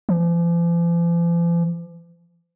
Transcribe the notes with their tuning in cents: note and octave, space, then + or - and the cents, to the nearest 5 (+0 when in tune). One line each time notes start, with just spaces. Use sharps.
F3 -45